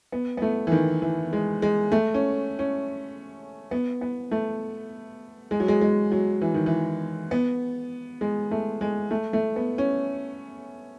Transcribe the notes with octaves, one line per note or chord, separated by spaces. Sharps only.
B3
B3
A3
E3
D#3
E3
G#3
G#3
A3
C#4
C#4
B3
B3
A3
G#3
F#3
G#3
G#3
F#3
E3
D#3
E3
B3
G#3
A3
G#3
A3
A3
B3
C#4